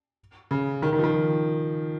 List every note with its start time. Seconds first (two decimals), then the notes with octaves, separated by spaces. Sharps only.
0.51 C#3
0.82 D#3
0.93 D#3
0.99 F3
1.04 D#3